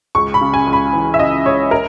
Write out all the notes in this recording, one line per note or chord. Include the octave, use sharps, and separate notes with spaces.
C#2 C#6
B5
C#3
G#5
C#2
B5
E3
E5
C#3 D#5
C#2 C#5
A#4